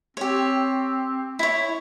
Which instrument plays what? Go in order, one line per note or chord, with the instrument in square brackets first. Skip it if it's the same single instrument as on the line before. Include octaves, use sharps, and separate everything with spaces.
[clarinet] C4 [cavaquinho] G4 C#5
[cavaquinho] E4 C#5